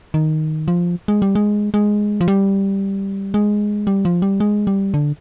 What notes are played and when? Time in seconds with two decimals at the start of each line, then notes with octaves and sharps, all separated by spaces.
0.14 D#3
0.68 F3
1.08 G#3
1.22 G3
1.35 G#3
1.74 G#3
2.21 F3
2.28 G3
3.34 G#3
3.87 G3
4.05 F3
4.22 G3
4.40 G#3
4.67 G3
4.94 D3